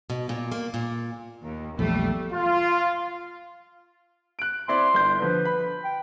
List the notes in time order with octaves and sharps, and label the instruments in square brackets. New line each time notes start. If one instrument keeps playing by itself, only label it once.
[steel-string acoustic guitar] B2
A#2
A#3
A#2
[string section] D#2
[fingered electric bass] A#1 E2 [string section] G3 A3
[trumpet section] F4
[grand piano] F#6 D7
[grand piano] C4 E4 D5 [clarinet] C6
[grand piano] G1 G6
[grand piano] D3 F3 [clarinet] B4
[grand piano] B5
[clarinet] G5